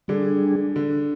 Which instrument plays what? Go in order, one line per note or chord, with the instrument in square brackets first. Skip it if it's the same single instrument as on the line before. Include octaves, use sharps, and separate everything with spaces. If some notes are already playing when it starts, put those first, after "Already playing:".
[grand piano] D3 [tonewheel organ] G3 D4 G#4
[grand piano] D3